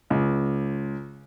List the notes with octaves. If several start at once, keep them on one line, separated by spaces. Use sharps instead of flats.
C#2